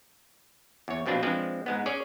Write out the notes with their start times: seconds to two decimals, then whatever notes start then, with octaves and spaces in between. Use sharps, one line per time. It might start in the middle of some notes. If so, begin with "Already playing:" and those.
0.88 E2 C#5
1.06 A#1 B2 C4 D4 F4
1.23 F3 G#3 C4 D4 B4
1.66 G#2 G#3 B3
1.86 C#4 G#4 C#5 D5